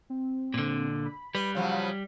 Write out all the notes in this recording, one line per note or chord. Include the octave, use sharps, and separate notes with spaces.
C4
A#2 D3
B5
G3 B4
C#3 F3 F#3